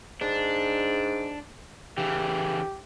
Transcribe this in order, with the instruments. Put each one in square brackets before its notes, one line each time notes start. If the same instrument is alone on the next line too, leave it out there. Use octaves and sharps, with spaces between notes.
[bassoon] G#2 [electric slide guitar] D4
[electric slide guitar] C#3 E3 [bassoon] G4